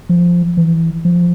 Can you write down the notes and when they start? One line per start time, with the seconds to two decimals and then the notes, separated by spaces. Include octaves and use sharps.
0.09 F3
0.57 E3
1.05 F3